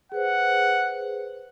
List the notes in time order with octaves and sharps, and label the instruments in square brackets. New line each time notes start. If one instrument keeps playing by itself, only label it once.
[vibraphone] G#4 B4 C5 [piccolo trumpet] F#5